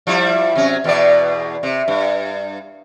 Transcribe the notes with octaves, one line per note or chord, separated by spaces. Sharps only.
F3 G3 E4
C3 F#3 C#4
E2 B2 D5
C3
G2